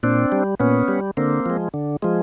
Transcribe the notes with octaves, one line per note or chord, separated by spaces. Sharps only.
A#2 C4 D4
G3
A#2 B3 C#4
G3
D3 A#3 C4
F3 G#3
D3
F3 G#3